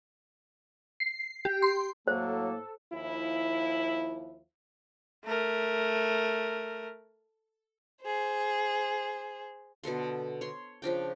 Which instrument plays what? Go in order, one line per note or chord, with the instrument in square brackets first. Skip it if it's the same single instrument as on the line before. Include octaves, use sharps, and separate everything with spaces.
[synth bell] C7
G4
C6
[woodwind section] A2 A#3 [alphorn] F#3 [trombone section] A4 [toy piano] C5
[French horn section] D#2 F3 E4
[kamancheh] A3 A#4
[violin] G#4 C5
[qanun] B2 D3 A4 C6
C#5 C6
C#3 F3 D4 G5